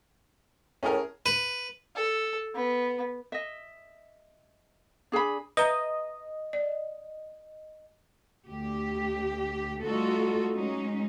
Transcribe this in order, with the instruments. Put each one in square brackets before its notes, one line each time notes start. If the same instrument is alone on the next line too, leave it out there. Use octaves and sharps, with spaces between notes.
[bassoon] A2 [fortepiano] C#4 G#4 A#4
[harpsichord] B4
[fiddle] A4
B3
[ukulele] D#5 E5
D4 G#4 G#5 B5
[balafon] B4 E5 A#5 [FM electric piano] D#5
[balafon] D5
[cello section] D2 G4
G3 A3 D#4 F4 F#4 A4
F#3 G#3 C#4 D#4